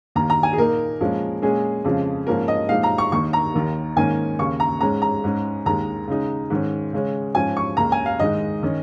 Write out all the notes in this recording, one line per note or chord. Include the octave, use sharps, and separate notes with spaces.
D#2 D#3 A#3 A#5
A#5
G#5
G#4
A#2 A#3 D#4 A#4
A#2 F3 G#3 C#4
A#2 G#3 C#4 G#4
F2 C#3 F3 G#3
G#2 F3 A#3 C#4 A#4
D#5
A#2 F3 G#3 D#4 F5
A#5
C#6
D#2 D#3 A#3 D#4 C#6
A#5
D#2 D#3 A#3
G#2 D#3 A#3 C#4 G#5
D#2 C#3 A#3 C#6
A#5
G#2 G#3 C#4 A#5
A#5
G#2 G#3 C#4
D#2 D#3 G#3 A#5
C#3 G#3 D#4
G#2 D#3 C#4
C#3 G#3 C#4
G#2 F3 C#4 G#5
C#6
C#2 C#3 A#3 C#4 A#5
G#5
F5
G#2 D#3 G#3 D#4 D#5
D#3 C#4